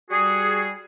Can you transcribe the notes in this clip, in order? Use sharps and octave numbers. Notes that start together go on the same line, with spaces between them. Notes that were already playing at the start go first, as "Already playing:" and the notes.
G3 F#4 G#4